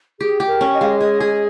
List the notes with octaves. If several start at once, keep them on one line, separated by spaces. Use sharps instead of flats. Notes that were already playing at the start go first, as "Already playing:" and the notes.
G4 G#4
G4
A#4
C#4
D#5
G#3 F5
D#5
G#4 D#5
G#4